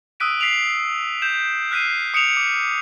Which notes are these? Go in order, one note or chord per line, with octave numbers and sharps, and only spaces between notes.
D#6 E6 F#6 B6 D7 D#7
B6 C7 D7 F7 F#7
G6 E7 F7
F6 F#6 B6 C7 D#7
D#6 C#7 D7 E7 F7
D6